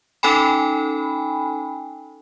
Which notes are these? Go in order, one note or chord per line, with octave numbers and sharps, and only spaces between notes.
C#4 D#4 A4 G5 G#5 B5